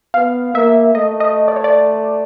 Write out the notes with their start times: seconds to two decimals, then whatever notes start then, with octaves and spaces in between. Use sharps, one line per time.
0.14 B3 F5
0.54 A#3 E5
0.94 A3 D#5
1.20 D#5
1.48 D5
1.56 C#5
1.64 D5